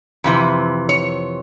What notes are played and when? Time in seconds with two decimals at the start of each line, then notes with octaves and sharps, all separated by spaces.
0.24 F2 C3 E3
0.89 C#5